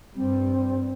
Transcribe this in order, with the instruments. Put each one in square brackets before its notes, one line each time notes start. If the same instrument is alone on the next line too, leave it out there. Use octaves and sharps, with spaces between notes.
[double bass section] G2 G3 [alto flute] C4